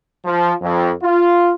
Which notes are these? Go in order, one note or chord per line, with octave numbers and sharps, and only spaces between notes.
F3
F2
F4